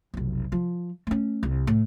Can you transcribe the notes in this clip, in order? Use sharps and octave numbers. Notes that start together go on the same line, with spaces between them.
F1 B1
F3
A3 C#4
C2
A2